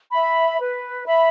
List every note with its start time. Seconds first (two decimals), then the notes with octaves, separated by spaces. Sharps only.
0.11 E5 B5
0.59 B4
1.06 E5 B5